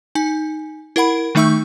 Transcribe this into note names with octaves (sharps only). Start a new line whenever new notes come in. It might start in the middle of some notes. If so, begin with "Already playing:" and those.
D#4 G#5
E4 A#4 F#5 B5
D#3 A3 D#4 E5 C#6 E6